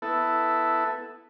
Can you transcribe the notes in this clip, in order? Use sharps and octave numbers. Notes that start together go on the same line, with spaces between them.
B3 E4 A4